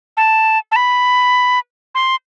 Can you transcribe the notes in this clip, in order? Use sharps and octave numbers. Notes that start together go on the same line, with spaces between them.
A5
A5
B5
C6